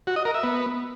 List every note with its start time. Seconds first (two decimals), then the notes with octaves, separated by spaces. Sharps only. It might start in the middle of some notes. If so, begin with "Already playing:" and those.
0.07 F#4
0.16 D#5
0.25 A#4
0.34 E5
0.44 B3